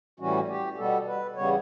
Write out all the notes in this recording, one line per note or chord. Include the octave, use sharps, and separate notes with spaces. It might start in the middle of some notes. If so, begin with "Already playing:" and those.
A2 E3 G3 C#4 F#4
G4
B2 G3 B3 A4
B4
E2 C#3 G3 B3 C#5